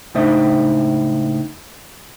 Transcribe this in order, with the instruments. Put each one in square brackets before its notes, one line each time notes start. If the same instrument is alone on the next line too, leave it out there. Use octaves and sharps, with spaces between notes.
[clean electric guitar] C#2 A2 D4 D#4 C5 E5